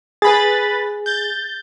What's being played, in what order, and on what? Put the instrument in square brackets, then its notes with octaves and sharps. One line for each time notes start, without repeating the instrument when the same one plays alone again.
[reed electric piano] G#4 [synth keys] B4 B5 A6
[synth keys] G6 A6